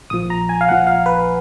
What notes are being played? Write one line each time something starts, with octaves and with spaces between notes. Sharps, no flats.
A#1 A#2 F3 D#6
A#5
G#5
F5
A#1 A#2 F3 F#5
F5
B4